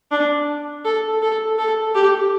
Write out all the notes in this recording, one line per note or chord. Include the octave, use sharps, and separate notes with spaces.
D4
A4
A4
A4
G4